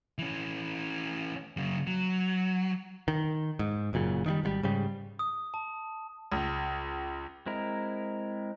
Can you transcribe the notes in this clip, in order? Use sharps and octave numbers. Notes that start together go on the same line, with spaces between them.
E3 C#4
F#2 C#3
F#3
D#3
G#2
F#1 F#2 A#2 C#3
D#3 E3 G3
G#1 D#3 G3
G#2 C#3 G3
D#6
A5
C#2
G#3 C4 E4 A#4